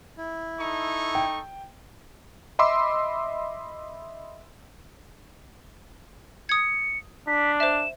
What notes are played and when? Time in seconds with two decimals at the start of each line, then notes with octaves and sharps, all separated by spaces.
0.17 E4
0.60 D#4 A4 C#6
1.15 G5
2.59 D#5 E5 B5 C6 D6 E6
6.49 D#6 G#6 C#7
7.28 D4 B6
7.60 C5 E5 E7